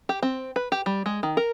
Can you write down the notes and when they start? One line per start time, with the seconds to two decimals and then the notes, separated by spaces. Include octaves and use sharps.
0.09 G4
0.23 C4
0.56 B4
0.72 G4
0.86 G3
1.06 G#3
1.23 D#3
1.37 A#4